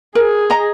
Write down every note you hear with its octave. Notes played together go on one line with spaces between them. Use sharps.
G#4 A#4
D#5 A#5